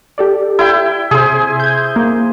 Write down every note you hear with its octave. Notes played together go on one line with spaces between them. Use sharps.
G4 A4 D5
E4 G5
C3 G#4 C5
G6 G#6
A#3